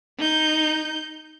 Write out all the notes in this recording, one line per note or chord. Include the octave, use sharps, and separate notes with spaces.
D#4 G6